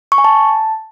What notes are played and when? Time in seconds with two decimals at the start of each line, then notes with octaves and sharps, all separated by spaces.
0.12 C#6
0.18 G#5
0.24 A5